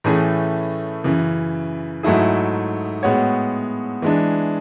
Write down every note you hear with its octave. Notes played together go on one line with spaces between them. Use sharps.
A2 E3 A3 C#4 G#4
F#2 C#3 E3
G#2 F#3 A3 E4 G#4
A2 G#3 B3 F#4 C#5
E3 G#3 D4